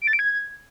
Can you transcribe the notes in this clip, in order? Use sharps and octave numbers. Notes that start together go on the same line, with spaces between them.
D7
A6
D7
G#6